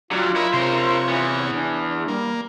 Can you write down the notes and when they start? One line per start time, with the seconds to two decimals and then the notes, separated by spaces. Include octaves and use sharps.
0.12 F#3 G3 D4 F4
0.36 E4 A#4 C#5 D#5
0.53 C3 A#4 C5 C#5
1.09 E3 B3
1.51 D4
2.08 G3 A#3